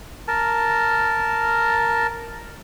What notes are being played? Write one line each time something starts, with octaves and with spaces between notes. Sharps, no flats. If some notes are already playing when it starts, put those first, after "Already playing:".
A#4 A5